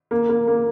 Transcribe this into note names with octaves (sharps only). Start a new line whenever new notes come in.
A#3
A#3
A#3